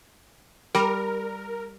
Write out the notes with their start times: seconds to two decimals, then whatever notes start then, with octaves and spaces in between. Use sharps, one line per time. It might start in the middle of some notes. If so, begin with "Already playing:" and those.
0.75 G3 A#4